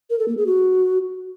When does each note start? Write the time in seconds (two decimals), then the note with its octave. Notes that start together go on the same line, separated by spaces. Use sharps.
0.10 A#4
0.19 A4
0.28 A#3
0.37 G#4
0.47 F#4